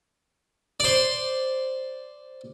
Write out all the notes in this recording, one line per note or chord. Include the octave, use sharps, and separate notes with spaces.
C5 D5